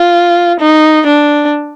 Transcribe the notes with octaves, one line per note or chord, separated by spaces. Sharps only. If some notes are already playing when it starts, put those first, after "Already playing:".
Already playing: F4
D#4
D4